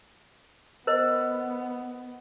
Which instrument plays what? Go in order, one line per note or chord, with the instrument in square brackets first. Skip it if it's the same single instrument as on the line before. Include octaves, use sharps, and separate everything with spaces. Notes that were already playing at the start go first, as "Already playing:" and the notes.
[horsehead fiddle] B3 [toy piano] A#4 C5 D#5